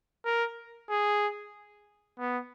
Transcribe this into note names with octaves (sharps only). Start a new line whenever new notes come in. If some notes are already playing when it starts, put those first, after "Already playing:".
A#4
G#4
B3